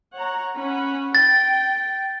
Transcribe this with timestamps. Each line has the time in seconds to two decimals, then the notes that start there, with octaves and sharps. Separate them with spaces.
0.13 C#5 F#5 A#5
0.56 C#4 F#5 B5
1.15 G5 A6